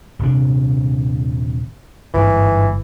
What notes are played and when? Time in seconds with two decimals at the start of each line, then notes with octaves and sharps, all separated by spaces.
0.19 D#1 C3 D4
2.14 G1 G#2 E3